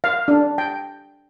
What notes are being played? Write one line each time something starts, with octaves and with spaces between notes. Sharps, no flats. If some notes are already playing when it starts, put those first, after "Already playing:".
F5
D4
G5